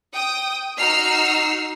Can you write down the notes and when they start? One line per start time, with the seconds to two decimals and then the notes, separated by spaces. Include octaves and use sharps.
0.12 G5 D#6
0.76 D#4 F#4 E6 F6 C7